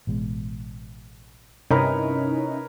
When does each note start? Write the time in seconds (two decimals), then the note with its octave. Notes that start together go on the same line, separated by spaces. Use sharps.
0.07 A1 B2 G#3
1.71 G2 C3 C#4 D#4 E4 A#4 B4 C#5